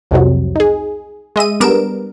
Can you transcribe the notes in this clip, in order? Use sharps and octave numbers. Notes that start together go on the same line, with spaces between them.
C2 F2 C3 F#3
D#4 G#4
G#3 D#5 E5 D#7
G3 B3 D4 A#4 D7 E7